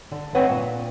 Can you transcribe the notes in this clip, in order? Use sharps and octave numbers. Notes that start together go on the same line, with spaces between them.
D3
D2 C4 B4 C#5 D#5 F#5
A#2